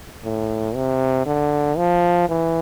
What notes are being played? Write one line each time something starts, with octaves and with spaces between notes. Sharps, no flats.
A2
C3
D3
F3
E3